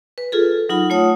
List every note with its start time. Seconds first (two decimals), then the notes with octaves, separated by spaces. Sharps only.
0.18 B4
0.32 F4 G#4 A4
0.69 F#3 D#4 F4 F#5 B5
0.90 A3 F4 C#5 F#5 D#6